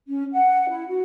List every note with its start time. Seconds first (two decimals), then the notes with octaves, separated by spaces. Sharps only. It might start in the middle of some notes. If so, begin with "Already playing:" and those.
0.08 C#4
0.32 F#5
0.69 E4
0.87 F#4